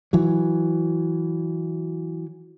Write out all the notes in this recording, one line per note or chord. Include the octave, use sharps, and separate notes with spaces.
E3 F#3